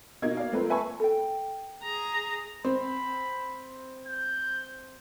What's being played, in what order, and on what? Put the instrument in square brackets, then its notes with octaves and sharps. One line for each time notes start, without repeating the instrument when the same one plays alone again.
[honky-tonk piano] B2 A#3 D#4 G#6
D5 F5
F3 A3 A#3 C4 A#4 B4
B4 E5 G#5 A5 B5 C#6
[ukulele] A4 G5
[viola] G#4 A#5
[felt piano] C4 [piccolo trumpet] B5
[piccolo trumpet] G6